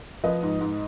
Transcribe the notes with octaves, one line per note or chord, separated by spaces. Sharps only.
F3 B4 D#5
G#2
G#2